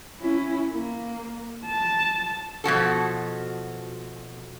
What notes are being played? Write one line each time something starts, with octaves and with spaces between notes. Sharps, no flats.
C#4 E4
A#3
A5
B2 F3 F#4 A4